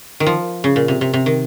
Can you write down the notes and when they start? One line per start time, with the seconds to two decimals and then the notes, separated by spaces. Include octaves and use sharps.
0.20 D#3
0.26 F3
0.64 C#3
0.76 A#2
0.88 C3
1.01 C3
1.14 C3
1.26 D#3